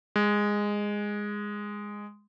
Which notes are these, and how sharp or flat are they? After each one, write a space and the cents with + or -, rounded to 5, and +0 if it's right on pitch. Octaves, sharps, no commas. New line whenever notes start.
G#3 -10